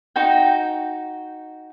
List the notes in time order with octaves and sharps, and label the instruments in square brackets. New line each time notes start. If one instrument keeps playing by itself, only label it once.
[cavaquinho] D#4 F#4 G5